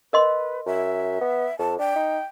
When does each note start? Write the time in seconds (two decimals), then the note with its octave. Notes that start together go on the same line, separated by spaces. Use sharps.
0.13 A#4 B4 D#5 C6
0.66 F#2 E5
1.21 B3
1.59 F2 A5
1.79 D4 G5
1.96 D#4